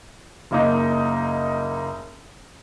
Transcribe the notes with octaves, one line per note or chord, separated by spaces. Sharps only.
F#1 A#3 D#4